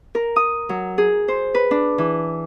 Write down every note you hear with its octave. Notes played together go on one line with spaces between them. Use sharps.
A#4
D#6
F#3
G#4
C5
B4
D4
E3